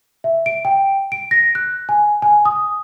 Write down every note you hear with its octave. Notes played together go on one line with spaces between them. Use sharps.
E5
D7
G5
D7
A#6
F#6
G#5
G#5
D#6